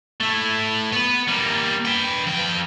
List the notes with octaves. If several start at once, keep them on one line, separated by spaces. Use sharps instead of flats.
A3 E4
B3 B4
G3 A#3
B4 G5
F2 G5